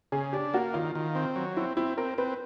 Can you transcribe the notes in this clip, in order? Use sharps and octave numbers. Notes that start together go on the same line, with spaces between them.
C#3 G#4
D4 G4
A#3 F#4
D#3 F4
D#3
C4
F#3
C4 E4
C4 E4
C4 A#4
C4 B4